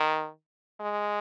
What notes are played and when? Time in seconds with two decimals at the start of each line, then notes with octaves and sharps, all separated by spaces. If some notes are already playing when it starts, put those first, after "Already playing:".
Already playing: D#3
0.80 G#3